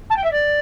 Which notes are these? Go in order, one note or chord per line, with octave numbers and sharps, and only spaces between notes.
A5
G5
E5
D5